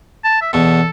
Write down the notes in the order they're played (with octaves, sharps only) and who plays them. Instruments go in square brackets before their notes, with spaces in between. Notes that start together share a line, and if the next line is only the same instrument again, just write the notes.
[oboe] A5
E5
[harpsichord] E2 B2 [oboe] A4